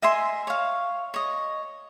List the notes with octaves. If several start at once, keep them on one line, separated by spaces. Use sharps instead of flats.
D#5 E5 G#5 C6
C#5 F5
C#5 D#5